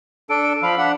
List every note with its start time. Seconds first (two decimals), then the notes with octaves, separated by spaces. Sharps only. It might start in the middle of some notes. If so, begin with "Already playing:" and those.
0.30 D4 A4 D7
0.63 F3 F5 B5
0.78 D4 F#5